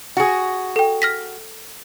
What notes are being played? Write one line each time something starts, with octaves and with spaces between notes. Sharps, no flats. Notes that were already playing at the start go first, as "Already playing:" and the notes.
F#4 G#4
A4 G5
F6 A#6 B6